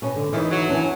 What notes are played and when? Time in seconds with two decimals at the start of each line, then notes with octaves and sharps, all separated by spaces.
0.02 B2 C#4
0.16 D3
0.33 E2 A#2 D#3 E3 D#4
0.51 F#3
0.69 E3 C#4 D4